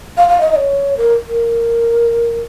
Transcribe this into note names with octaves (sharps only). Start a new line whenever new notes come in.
F5
F5
D#5
D#5
C#5
A#4
A#4